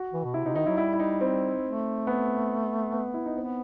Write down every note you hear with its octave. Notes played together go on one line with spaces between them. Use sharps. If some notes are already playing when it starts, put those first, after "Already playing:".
Already playing: F#4
E3
B2
C3 E4
C3 D#4
D#3 D#4
F#3 E4
G3 E4
E4
D#4
C4
A3
B3
B3
E4
D#4
B3 C4